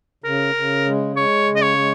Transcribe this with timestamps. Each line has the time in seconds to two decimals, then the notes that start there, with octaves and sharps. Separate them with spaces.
0.24 C#3 A#4
0.55 C#3
0.86 G#3
1.16 G#3 C#5
1.47 C#3
1.56 D#5
1.62 C#5
1.78 G#3